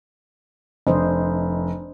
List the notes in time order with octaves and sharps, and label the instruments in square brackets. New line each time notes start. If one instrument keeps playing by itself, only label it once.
[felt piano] F1 [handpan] D4 C5 D#5